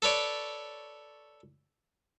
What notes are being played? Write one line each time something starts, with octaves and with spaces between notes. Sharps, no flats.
A4 B4 C#5 D5